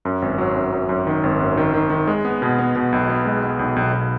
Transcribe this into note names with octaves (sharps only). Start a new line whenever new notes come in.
F#2
G#1
F#3
F#2
F#2
F#2
D#3
G#1
F#2
D#3
D#3
D#3
G#3
B3
B2
B3
B2
B1
B3
G#3
B3
B1
B1
B1